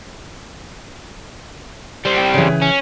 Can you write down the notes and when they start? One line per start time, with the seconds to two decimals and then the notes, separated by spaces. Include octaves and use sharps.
2.05 G3 C4
2.17 G5
2.34 C#3 E3
2.62 C#4